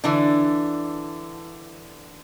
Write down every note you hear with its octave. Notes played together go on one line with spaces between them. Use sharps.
D3 E3 D4